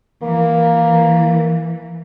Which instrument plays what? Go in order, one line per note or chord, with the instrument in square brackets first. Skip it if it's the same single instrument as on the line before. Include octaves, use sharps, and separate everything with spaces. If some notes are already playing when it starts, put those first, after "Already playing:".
[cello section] E3 [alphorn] A#3